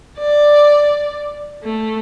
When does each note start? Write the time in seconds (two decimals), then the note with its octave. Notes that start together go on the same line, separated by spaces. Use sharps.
0.18 D5
1.63 A3